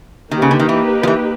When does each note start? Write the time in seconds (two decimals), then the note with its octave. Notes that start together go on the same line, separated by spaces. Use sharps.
0.31 D#3 A#3 D#4 G4 B4
0.42 C#3
0.51 D3
0.60 D#3
0.69 E3
1.03 F3
1.08 E3